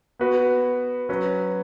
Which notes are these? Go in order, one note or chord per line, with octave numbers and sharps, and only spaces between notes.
B3 F#4 B4
F#3 C#4 B4